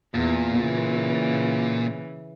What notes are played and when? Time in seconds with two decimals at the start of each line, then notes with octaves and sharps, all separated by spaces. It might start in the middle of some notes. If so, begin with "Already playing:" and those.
0.15 E2 A#2
0.60 C#3 E3